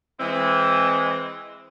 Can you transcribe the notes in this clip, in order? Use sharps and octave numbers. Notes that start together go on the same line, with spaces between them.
E3 G#3 C4